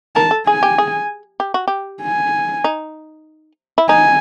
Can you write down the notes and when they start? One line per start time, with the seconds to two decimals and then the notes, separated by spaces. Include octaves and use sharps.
0.16 A#4 A5
0.31 A4
0.47 G#4 G#5
0.63 G4
0.78 G#4
1.40 G4
1.54 F#4
1.68 G4
2.02 G#5
2.64 D#4
3.78 E4
3.89 D#4 G#5